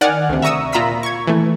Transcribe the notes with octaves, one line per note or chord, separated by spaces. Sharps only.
D#3 D5 F#5 G#5 F6
D2 C3
E5 A#5 C#6 D#6 E6
A#2 F4 A#5 B5 E6 B6
C#6 G#6
E3 A3